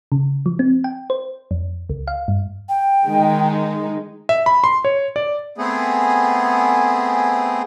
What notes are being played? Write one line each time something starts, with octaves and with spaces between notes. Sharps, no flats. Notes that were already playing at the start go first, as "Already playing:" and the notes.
C#3
F3
C4
G5
C5
F2
C#2
F5
G2
G5
D#3 G#3 D#4
E5
B5
C6
C#5
D5
A3 B3 C4 G#4